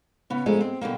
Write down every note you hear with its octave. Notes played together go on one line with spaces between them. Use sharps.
C#3 B3 C#4
G2 F3 G#3 A3 A#5
C4
B2 D3 G3 A#3